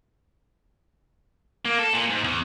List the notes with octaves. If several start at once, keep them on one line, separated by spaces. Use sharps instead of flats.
A#3
A4
A#2
G#2
E2